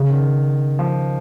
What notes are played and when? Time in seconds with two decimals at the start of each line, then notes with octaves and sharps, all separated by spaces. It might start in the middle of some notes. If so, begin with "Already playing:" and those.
Already playing: C#3
0.10 D#3
0.79 F3